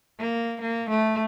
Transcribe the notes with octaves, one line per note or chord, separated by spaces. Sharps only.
A#3
A#3
A3